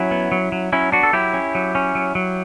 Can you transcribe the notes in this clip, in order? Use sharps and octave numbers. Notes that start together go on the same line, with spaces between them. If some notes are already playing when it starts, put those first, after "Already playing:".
Already playing: F#3 C#4 E4
B3
F#3
F#3
F#3 C#4 E4
B3 D4 F#4
A4
F#3 E4 G4
C#4
F#3
C#4
F#3
F#3